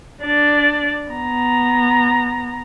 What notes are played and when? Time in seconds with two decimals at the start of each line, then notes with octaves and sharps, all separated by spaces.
0.22 D4 D5
1.11 B3 A#5